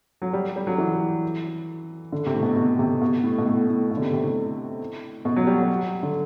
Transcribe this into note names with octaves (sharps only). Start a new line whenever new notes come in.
F#3
G3
G3
F#3
E3
D3
C3
A2
B2
B2
C3
B2
A2
B2
A2
A2
B2
D3
C3
C3
A2
B2
F#3
G3
F#3
D3